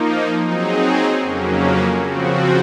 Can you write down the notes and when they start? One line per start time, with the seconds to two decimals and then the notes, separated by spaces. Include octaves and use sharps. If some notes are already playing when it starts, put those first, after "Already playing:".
Already playing: F3 A#3 D#4
0.43 F#3 C4 D#4 G#4
1.22 F2 C#3 F#3 A#3 C#4
1.99 C#3 F3 C4 F#4